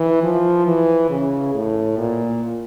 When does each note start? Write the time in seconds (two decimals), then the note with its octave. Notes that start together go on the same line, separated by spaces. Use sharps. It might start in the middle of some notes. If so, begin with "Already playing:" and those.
Already playing: E3
0.23 F3
0.67 E3
1.10 C#3
1.55 A2
1.98 A#2